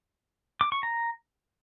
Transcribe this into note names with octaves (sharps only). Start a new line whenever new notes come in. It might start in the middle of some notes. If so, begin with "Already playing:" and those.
D6
C#6
A#5